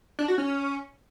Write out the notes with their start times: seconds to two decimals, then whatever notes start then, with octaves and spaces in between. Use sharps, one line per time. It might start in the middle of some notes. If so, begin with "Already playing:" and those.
0.19 D4
0.28 F#4
0.38 C#4